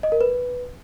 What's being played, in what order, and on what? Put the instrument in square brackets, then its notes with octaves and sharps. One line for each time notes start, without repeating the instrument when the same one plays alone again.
[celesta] D#5
A#4
B4